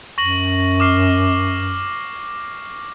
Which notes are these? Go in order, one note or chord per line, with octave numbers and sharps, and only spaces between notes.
F#2 C#6 A#6 F#7
D6 F6 C7